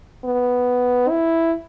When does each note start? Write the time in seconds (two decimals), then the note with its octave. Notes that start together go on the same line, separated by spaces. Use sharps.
0.24 B3
1.09 E4